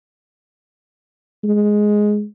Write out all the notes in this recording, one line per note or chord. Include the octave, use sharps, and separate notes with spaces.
G#3